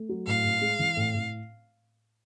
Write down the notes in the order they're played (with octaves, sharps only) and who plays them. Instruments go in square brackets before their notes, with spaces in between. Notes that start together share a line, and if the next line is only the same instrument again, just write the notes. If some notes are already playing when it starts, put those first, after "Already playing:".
Already playing: [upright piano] A3
F#3
[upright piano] A2 [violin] F5
[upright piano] A2
G#3
E3
A2
A2